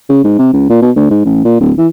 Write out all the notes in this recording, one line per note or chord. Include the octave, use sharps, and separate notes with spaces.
C#3
G#2
C3
C#2
A#2
B2
D2
G#2
A1
A#2
D1
E3